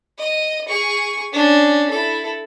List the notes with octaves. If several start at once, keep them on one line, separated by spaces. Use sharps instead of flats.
D#5
G#4 C#6
C#4 D4
E4 A4